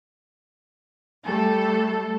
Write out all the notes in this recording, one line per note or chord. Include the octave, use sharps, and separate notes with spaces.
G3 A3 A4